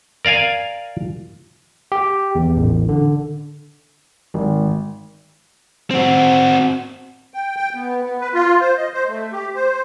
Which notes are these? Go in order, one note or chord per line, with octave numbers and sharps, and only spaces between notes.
A#4 D5 F5 G#5
G4
E2
A1
D3
G#1
C4 F#4
G5
G5
B3
B3
B4
F4
C5
D#5
C5
A3
G4
C5